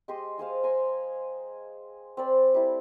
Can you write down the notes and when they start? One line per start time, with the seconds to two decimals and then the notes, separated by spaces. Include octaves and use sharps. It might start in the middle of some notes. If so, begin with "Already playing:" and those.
0.08 G#3 G4 D#5 C6
0.38 G#3 G#4 C5 F5
0.64 G#5 A#5 C6
2.17 C4 D5 B5 C6
2.54 G3 A3 E4